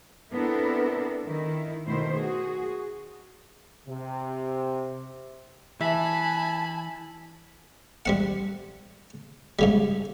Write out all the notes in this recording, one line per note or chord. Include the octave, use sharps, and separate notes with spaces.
B3 C4 D4 E4 A4 A#4
D#3 E4
B2 D#3 A3 E4 C5
F#4 G#4
C3
E3 E5 G#5 A5 B5
G3 C4 F#5
G#2 C#3 G3